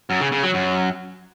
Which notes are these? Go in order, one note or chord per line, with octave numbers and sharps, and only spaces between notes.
F#2
C#3
C#3
F#3
F#2